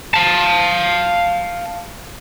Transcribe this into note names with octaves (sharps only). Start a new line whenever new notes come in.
F5 A5